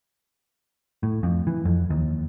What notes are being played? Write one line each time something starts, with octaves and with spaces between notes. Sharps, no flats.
A2
F2
E3
F2
D#2